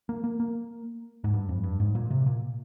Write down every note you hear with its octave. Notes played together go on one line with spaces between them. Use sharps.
A#3
A#3
A#3
G#2
G2
F2
G2
G#2
A#2
C3
A#2